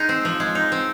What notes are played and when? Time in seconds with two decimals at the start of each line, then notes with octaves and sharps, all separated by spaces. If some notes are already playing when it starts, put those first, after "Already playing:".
Already playing: G#3 D#4
0.09 C4
0.25 F3
0.40 G#3
0.55 D#4
0.72 C4